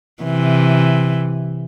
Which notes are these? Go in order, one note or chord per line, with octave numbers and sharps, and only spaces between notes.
C3 E3